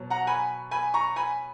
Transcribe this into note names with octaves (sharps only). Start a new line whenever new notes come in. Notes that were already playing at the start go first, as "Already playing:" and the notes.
Already playing: B2 F#3
F#5 A#5
G#5 B5
G#5 B5
A#5 C#6
G#5 B5